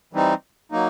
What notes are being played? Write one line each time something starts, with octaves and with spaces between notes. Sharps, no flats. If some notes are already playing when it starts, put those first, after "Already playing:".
E3 G3 C4 D#4
F#3 A#3 D#4